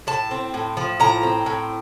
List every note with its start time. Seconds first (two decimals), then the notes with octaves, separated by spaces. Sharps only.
0.07 A2 A5
0.31 C4
0.54 A2
0.77 F3
1.00 A2 A#5
1.23 C4
1.46 A2